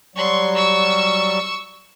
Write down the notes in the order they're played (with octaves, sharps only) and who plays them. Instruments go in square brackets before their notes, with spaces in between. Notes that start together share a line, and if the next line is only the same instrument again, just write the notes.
[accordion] F#3 G3 [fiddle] C6 C#6
[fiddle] C#6 E6